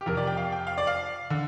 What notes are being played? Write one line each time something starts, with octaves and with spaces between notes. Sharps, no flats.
G4
F2 C3 A#4
D5
G5
F5
G5
F5
D5
F5
D3